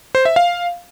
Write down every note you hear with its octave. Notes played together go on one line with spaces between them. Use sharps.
C5
E5
F5